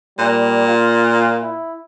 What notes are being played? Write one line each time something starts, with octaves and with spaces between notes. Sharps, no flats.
A#2 G3
F4
E4